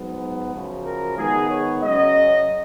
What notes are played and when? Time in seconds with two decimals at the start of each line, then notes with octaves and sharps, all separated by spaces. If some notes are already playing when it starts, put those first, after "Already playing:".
Already playing: G#2 F#3 B3
0.52 F#2 C#3 F3
0.85 A#4
1.17 D#3 G#3 B3 G#4
1.49 C#5
1.82 F#2 C#3 F#3 C#4 D#5